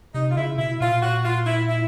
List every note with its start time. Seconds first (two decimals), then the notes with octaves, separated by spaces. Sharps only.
0.14 C3 D#4
0.31 F4
0.36 C#3 E4
0.58 B2 E4
0.80 A#2 F4
1.03 F#4
1.25 F4
1.46 E4
1.68 E4